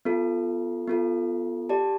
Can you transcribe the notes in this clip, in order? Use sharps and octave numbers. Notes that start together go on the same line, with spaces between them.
B3 F4 A4
B3 F4 A4
G4 D5 A5